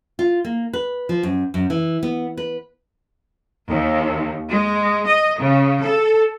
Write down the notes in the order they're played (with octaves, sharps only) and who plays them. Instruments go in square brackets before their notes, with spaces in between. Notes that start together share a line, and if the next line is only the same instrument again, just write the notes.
[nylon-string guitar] F4
A#3
B4
F3
F#2
F#2
E3
B3
B4
[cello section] D#2
G#3
D#5
C#3
A4